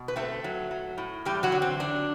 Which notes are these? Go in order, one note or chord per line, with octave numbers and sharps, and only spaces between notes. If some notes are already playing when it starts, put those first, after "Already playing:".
Already playing: B2
B4
A3 C4 A4
F#3
F#3
A2
E2 G3 G4
F#3 F#4
D3
C4
F#3 D4